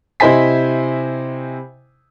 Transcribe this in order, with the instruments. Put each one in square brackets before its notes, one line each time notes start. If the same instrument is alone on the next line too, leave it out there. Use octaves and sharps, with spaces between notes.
[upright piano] C3 E4 C5 D#5 G#5 B6